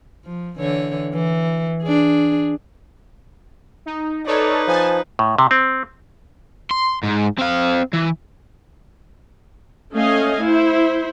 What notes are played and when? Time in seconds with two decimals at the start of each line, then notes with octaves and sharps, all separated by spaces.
0.25 F3
0.58 D3 E3 C#5
1.14 E3
1.83 D4 G#4
3.86 D#4
4.26 D#4 A4 B4 C#5 D5
4.68 F3 G#5 A5
5.19 A2
5.38 C3
5.51 C4
6.71 C6
7.04 G#2
7.39 C4 F5
7.94 E3
9.95 A3 C#4 D#5 F5 G#5
10.44 E4 C5